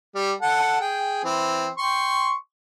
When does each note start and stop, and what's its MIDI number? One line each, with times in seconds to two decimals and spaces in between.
0.15 0.32 55
0.41 0.78 69
0.41 0.78 78
0.41 0.78 81
0.81 1.19 68
0.81 1.19 79
1.24 1.68 52
1.24 1.68 60
1.78 2.31 79
1.78 2.31 84
1.78 2.31 85